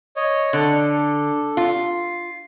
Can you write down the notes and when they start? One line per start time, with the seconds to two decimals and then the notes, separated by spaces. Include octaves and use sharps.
0.16 C#5 D#5
0.53 D3 A4
1.57 F4